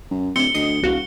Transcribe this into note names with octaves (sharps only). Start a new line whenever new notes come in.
F#2
D1 C4 C#7 G7
D2 D#5 D#6 C7
E1 C2 F#4 F5